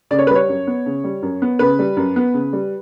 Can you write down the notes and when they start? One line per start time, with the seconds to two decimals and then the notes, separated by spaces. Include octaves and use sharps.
0.11 C#3 D5
0.19 C#5
0.27 G3 B4
0.35 C#5
0.49 F#2
0.67 B3
0.86 C#3
1.04 G3
1.23 F#2
1.42 B3
1.59 C#3 B4
1.79 G3
1.97 F#2
2.16 B3
2.34 C#3
2.53 G3